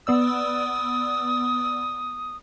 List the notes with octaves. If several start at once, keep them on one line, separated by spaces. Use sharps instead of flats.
B3 D5 D#6 E6